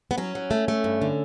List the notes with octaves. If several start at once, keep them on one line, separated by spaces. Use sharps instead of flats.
B3
F#3 C#4
F#3
A3
A3
G2
D3